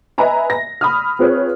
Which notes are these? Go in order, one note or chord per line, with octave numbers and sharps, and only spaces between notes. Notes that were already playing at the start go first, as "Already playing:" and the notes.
B4 D#5 E5 G#5 A#5 B5
A#6
B5 D#6 F6
C4 F4 G#4 B4 C#5